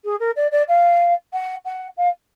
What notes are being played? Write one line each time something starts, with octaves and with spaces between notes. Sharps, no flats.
G#4
A#4
D5
D5
F5
F#5
F#5
F5